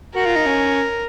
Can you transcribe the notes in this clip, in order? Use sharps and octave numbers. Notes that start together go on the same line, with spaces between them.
F#4 A#4
F4
D#4
C#4